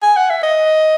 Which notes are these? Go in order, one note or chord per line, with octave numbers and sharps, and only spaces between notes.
G#5
F#5
E5
D#5